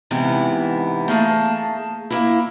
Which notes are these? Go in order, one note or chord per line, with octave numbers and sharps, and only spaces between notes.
G#2 C3 E3 B3 E4
A3 A#3 G#4 A5
A#3 E4